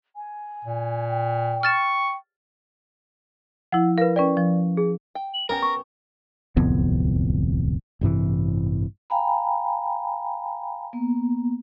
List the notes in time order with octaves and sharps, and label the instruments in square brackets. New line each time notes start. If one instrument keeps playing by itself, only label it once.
[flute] G#5
[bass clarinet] A#2
[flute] G5
[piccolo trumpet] C#6 [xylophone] F6 A6 E7
[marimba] F3 E4 [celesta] F#5
[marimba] A#4 [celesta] B4 F5
[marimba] C#4 B4 G5 [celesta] D5
[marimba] F3
[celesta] G#4
[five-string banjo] G5
[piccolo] F#7
[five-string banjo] B3 C#4 G4 [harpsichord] A#4 [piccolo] A#6
[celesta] C#6
[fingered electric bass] D1 C2 F2 B3
A1 G2 C3 E3
[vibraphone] F5 G5 G#5 A#5 B5
A#3 B3